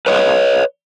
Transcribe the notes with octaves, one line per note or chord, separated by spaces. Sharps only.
B4 C#5 D#5